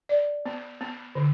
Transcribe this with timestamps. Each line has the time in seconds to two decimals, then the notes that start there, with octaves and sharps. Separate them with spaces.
0.09 D5
0.46 B3
0.81 B3
1.15 D3